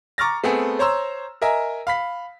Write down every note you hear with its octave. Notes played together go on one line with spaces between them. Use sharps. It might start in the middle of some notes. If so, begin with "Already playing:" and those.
A#5 C#6 D6 F6 A6 A#6
A3 B3 C4 G#4
C5 C#5 A#5 C6 E6
A#4 D#5 E5 G#5 A#5
F5 B5 B6